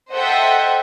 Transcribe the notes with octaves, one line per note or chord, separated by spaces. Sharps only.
A4 C5 D#5 E5 F#5 G5